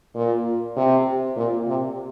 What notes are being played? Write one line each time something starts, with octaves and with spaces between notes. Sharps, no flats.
A#2
C3
A#2
C3